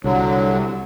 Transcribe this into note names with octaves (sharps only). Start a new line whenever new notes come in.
C2 D3 F#3